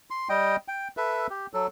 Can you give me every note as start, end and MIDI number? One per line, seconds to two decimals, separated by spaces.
0.10 0.28 84
0.29 0.56 55
0.29 0.56 75
0.29 0.56 79
0.68 0.88 79
0.97 1.27 69
0.97 1.27 71
0.97 1.27 76
1.30 1.47 67
1.54 1.67 54
1.54 1.67 69